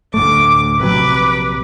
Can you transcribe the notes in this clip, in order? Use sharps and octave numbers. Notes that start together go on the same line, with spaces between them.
D2 A2 A3 D6
A#1 C3 F#3 B4 D6